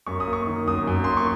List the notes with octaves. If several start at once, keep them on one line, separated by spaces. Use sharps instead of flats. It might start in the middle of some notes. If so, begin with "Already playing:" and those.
F#2 C#6
D#6
A#3
C#6
D#3
F#2 D#6
F#2
A#3 C6
C#6